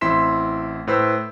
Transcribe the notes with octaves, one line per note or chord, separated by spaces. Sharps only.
A1 C4 E4 C6 B6 E7
A2 B4 C5 E6 B6